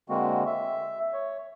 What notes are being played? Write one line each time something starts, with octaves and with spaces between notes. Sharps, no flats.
D3 G#3 A#3 C4 F#4
E5
C#5